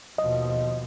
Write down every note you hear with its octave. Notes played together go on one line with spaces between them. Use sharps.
D#2 B2 F3 D#5